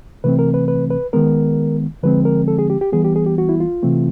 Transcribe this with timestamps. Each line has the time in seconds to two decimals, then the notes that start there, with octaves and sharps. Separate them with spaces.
0.24 C3 E3 A3 C4 B4
0.39 A#4
0.54 B4
0.68 B4
0.90 B4
1.13 D#3 G#3 B3 A#4
2.03 D3 F3 G#3 C4 B4
2.25 A#4
2.48 A4
2.59 G#4
2.70 G4
2.81 G4
2.93 E3 G3 B3 G#4
3.04 G4
3.16 G#4
3.26 G4
3.38 F#4
3.49 E4
3.60 F4
3.83 C3 E3 A3 C4